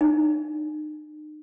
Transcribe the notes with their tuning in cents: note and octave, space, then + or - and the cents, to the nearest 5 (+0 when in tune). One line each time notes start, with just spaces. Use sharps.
D#4 -40